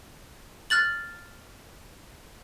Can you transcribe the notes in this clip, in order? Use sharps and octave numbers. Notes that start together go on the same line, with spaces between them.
F6 F#6 A6 F#7